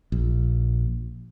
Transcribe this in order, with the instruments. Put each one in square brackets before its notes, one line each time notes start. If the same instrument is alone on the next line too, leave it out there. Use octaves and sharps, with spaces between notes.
[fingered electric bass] A#1